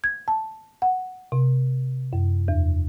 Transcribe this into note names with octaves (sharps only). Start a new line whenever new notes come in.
G#6
A5
F#5
C3
F#2
E2